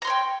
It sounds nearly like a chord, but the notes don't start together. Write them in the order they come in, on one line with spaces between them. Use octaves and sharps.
A#5 C6 C#5 G5